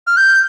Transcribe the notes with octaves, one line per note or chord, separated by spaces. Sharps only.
F6
G6